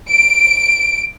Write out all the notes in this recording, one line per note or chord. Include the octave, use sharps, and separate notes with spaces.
D7